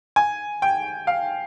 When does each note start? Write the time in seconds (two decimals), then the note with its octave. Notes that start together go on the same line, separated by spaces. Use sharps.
0.16 G#5
0.62 G5
1.07 F5